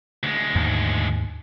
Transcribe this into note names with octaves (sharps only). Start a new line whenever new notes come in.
D2 G#3
D#2 G#2